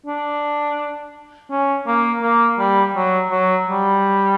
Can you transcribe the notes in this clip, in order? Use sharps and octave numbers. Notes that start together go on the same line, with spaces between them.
D4
C#4
A#3
A#3
G3
F#3
F#3
G3